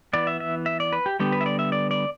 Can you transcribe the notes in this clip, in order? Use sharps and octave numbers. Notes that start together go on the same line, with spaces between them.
E3 B3 D5
E5
E5
E5
D5
B4
G4
D3 G3 B3 G4
B4
E5
D5
E5
D5
D5